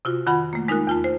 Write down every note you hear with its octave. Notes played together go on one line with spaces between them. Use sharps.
C3 F4 F#4
F2 D#3 F4 F#5 B5
A3 A#3
G#3 D#4 F4 A#4 F#6
E2 F4 A5
C5